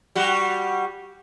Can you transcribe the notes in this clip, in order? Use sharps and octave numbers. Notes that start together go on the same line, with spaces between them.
G3 F#4